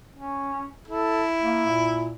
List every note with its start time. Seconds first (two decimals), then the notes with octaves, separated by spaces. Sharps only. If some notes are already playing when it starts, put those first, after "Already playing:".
0.15 C#4
0.88 E4 A4
1.41 A#3
1.67 A#2